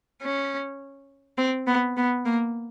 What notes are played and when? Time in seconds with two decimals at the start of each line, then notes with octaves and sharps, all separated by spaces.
0.22 C#4
1.38 C4
1.67 B3
1.97 B3
2.25 A#3